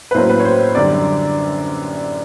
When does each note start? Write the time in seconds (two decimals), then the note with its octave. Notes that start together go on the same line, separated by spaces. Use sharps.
0.11 B4
0.15 A2 F#3 A#3 C#4 C5
0.29 B4
0.40 C#5
0.45 C5
0.75 F#2 D3 G3 D5